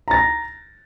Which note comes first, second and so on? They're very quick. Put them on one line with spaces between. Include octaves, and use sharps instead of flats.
A#5 A6 A#6